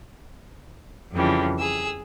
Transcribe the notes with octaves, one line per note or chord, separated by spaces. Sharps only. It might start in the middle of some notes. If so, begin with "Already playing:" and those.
F2 C#3 E3 F3 G3
G#4 E6